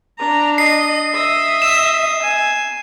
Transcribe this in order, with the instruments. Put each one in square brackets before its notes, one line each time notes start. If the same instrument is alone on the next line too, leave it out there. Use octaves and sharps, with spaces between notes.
[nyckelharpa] D4 [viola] A#5
[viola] D#5 [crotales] C7
[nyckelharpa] D#5 [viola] E5
[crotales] E7
[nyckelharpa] G#5